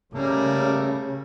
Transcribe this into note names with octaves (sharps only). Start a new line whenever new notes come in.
C#3 G3 A3 A#3